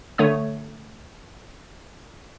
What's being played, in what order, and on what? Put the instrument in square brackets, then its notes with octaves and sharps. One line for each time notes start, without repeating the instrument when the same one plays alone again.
[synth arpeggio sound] D3 A3 C#5 D#6